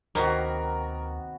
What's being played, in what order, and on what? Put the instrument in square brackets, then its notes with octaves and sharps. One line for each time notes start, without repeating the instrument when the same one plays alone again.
[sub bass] D2 [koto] C3 D#3 A#3 [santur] B3 F#4 [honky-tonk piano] A#4